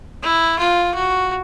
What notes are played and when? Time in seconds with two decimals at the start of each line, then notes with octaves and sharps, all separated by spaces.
0.23 E4
0.59 F4
0.95 F#4